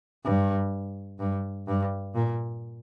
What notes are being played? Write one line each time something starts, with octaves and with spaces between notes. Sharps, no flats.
G2
G2
G2
A#2